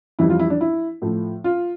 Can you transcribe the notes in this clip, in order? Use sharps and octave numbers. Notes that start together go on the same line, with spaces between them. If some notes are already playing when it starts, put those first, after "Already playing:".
F2 E3 G3 E4
F4
E4
D4
E4
A2 F3 A3
F4